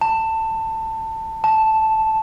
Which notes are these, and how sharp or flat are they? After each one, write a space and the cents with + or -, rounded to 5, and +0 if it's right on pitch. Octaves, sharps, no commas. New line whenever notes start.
A5 +20
A5 -5